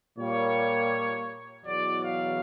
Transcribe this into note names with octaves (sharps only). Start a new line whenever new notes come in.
A#2 G3 A#3 C#5
E2 B2 F#3 D5
F5